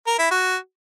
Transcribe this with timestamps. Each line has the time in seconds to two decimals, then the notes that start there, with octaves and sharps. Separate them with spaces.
0.07 A#4
0.19 E4
0.31 F#4